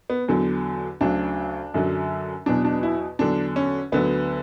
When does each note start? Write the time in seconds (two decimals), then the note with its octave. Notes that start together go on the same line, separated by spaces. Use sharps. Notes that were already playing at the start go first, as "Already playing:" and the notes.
0.10 B3
0.28 E2 D3 F#3
1.01 D2 C#3 F#3 D4
1.74 F#2 D3 F#3
2.46 E2 B2 F#3 D4
2.65 D4
2.83 E4
3.19 E2 D3 F#3 D4
3.56 C#4
3.92 D2 D3 F#3 B3